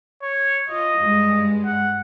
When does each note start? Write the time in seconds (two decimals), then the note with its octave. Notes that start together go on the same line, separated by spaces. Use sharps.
0.23 C#5
0.68 F4 D#5
0.97 G2 G#3
1.65 F#5